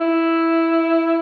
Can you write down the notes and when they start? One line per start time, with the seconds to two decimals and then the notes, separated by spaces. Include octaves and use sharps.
0.01 E4